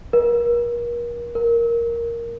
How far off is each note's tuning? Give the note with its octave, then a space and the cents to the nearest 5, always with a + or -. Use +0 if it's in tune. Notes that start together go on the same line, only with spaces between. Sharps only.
A#4 +35
A#4 +5